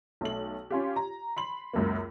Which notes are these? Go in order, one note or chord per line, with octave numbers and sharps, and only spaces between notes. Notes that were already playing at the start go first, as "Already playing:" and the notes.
B1 A3 F#7
C#4 F4 G4
A#5
B5 C6 F#7
C#2 F#2 A#3